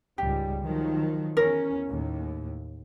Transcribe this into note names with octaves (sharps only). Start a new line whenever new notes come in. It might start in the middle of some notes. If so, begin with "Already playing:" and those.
C#2 G#2 G3 G4
D#3 F3 F#3
E2 C#4 A#4
D#2 A2